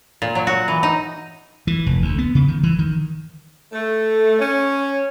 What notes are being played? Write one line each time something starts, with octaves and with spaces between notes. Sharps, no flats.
A#2
F#3
F#4
E3
D#4
E3
F1
D2
B3
C#3
D#3
E3
D#3
A3
C#4